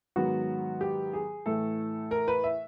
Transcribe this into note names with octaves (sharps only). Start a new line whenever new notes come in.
G#2 D#3 F#3 B3 F#4
G4
G#4
A2 E3 A3 A4
A#4
B4
E5